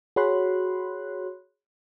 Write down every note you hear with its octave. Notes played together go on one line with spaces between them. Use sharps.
F#4 G#4 C#5 B5 C6 F#6